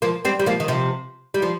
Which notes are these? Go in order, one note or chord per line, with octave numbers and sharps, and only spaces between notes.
F3 A#3
G3 C4
G3
F3 A#3
D#3
C3 F3
G3
F3